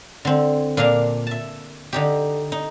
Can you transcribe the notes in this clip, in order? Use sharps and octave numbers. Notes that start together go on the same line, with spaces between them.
D3 C4
A#2 D4 A#4 F5 A5
E5 A5
D3 D#4 G4
D#4